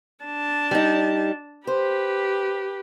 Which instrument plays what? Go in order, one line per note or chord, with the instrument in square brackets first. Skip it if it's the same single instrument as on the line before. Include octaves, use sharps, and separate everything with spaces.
[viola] D4 A5
[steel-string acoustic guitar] G3 D#4
[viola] G4 B4 [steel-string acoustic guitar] C5